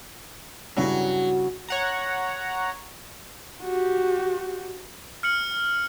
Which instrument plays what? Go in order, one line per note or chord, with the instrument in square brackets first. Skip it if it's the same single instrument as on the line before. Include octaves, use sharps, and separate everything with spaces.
[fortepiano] G2 C#3 E4 [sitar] F#3
[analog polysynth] C#5 F#5 A#5
[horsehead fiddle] F#4 G4
[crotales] F6 C#7 F#7